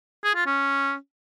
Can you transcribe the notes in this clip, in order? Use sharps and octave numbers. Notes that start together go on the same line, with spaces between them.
G#4
F4
C#4